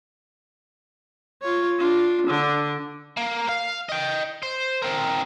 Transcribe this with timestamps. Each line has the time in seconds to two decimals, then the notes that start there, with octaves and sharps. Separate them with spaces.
1.42 F4 C#5
1.78 D4 F4
2.27 D3 D4
3.17 A#3
3.49 F5
3.89 D#5 G5
4.42 C5
4.82 C4 A#4